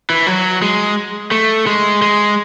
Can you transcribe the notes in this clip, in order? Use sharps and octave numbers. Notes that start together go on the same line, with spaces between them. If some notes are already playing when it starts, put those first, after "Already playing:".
E3
F#3
G#3
A3
G#3
G#3